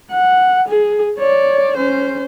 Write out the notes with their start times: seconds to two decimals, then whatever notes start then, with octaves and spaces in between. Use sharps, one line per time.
0.11 F#5
0.68 G#4
1.18 C#5 D5
1.77 C#4 C5